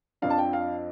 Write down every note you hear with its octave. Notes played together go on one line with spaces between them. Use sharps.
F2 F3 D4 F5
A5
G5
F5